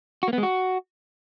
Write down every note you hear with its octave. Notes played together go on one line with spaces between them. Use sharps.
F#4
A#3
B3
G#3
F#4